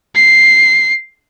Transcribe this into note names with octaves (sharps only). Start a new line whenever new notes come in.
C7